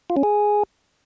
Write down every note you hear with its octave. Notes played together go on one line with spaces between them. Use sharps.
F4
C#4
G#4